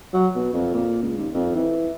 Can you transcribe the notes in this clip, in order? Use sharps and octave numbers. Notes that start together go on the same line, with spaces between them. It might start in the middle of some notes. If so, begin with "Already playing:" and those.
F#3
B2
F2
A#2
C#2
D#2
F2
E3